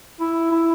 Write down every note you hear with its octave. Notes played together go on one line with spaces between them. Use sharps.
E4
E4